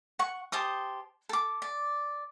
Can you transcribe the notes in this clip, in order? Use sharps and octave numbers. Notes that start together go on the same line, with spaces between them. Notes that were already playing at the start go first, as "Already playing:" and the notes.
F#5 C#6
G4 C5 A5 D#6
A4 D6
D5